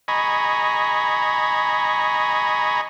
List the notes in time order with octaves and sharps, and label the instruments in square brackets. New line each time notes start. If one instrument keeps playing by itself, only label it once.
[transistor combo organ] D#5 G#5 A#5 B5 C#6